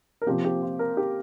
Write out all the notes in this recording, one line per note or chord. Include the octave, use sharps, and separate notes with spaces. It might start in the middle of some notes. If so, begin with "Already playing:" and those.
A#4
C3 F3 A#3 G4
G4
F4
A#4
G4